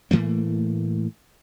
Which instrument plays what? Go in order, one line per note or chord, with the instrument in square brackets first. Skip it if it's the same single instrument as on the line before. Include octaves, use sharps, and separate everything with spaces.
[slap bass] A2 E3 A3 A#3